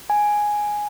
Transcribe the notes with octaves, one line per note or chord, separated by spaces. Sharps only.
G#5